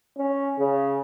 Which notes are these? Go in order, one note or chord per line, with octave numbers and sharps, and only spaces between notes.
C#4
C#3